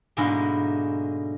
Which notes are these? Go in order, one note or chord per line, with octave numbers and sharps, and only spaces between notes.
G#2 B2 D3 G#3 A#3 E4